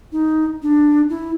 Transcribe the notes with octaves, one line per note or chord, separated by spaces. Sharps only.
D#4
D4
E4